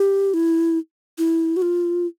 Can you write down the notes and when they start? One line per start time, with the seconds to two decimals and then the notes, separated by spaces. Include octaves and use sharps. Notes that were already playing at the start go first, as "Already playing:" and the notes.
Already playing: G4
0.34 E4
1.18 E4
1.56 F#4
1.62 F4